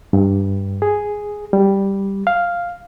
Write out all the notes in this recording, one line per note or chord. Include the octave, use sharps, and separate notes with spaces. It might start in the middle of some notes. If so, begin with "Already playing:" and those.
G2
G#4
G3
F5